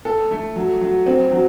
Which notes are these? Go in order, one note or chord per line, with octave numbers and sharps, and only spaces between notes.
A4
A3
F#3
F#3
C4
F#3